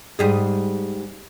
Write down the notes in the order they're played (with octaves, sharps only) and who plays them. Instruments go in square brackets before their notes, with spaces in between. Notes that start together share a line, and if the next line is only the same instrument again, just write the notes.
[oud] G#2 G3 G#4